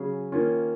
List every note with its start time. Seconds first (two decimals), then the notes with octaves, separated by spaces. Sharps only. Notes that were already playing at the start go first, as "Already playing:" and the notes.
Already playing: C#3 F#3 C#4 G#4
0.32 D#3 A#3 C#4 F4